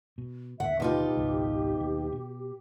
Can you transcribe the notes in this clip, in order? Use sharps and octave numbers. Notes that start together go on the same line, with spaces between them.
B2
D#2 A2 D3 E5 F#5
B2 D#4 F4 G4
G#1 C#2
D#2
B2